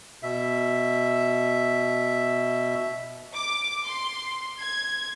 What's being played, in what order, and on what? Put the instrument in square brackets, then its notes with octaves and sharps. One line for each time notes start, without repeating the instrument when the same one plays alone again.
[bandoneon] B2 E5
[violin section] D6
C6
G#6